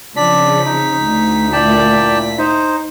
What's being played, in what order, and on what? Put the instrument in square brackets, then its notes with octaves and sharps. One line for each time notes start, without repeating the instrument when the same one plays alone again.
[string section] C#3 F3 C4 [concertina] D4 D5 [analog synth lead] B6
[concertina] D#4
[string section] D2
[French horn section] A#2 E4 [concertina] D5 G5 A5
[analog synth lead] D#4 [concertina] C5